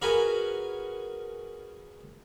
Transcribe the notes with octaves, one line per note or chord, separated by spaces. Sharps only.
C#4 F#4 G#4 A#4 B4 G#5